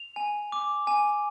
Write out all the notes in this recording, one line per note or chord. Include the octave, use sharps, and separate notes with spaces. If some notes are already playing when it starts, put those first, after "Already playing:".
Already playing: F7
G#5
D6
G#5